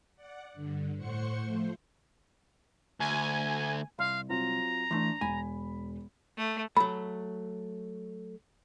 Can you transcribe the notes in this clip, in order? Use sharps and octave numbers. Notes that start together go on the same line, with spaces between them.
D5 F#5
G2 D3
A2 C5 F#5 C6 C#6 C#7
F3 A3 C5
D2 G#5
C2 F5 C6
F#3 C4 F4 A#5
E3 A3 D4 C6
E1 G#5 B5
A3
F#3 A3 B5